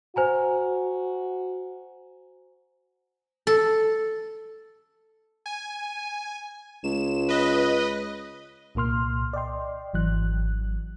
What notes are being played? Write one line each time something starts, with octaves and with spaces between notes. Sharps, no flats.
F#4 C5 G#5 A#5
A4
G#5
C#2 E7
B4 D#5
C2 A#2 A#3 C6 F6
D5 D#5 G5 C6
G#1 E3 F#3 F#6